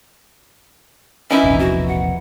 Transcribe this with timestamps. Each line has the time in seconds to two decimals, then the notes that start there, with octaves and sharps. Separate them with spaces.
1.31 E3 C#4 D#4 E4
1.43 E1 A#1 C3
1.59 F#4
1.88 F#5